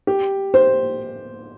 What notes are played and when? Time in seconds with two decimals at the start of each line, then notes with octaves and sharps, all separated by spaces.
0.07 G4
0.54 C5